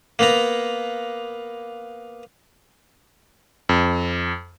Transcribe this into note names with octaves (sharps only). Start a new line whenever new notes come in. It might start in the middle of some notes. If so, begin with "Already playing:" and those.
A#3 B3 A#5
F2